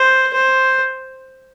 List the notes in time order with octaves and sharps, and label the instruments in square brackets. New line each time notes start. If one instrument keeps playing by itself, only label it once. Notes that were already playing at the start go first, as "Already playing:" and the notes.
Already playing: [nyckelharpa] C5
C5